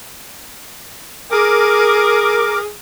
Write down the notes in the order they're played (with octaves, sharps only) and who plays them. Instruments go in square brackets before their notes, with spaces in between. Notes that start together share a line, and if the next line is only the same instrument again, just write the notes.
[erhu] G#4 [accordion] A#4 D6